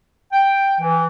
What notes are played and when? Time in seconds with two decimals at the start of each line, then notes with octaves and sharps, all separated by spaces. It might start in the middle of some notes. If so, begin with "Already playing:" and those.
0.33 G5
0.81 E3